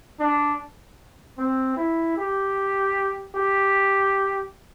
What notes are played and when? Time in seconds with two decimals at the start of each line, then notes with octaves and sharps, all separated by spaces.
0.19 D4
1.38 C4
1.76 E4
2.16 G4
3.35 G4